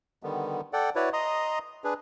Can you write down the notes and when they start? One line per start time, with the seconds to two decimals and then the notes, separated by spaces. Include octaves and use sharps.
0.23 D3 D#3 G3 B3
0.73 A4 D5 F#5 G5
0.96 E4 F#4 B4 C#5 D5
1.13 D#5 A#5 C6 D#6
1.84 D4 G#4 B4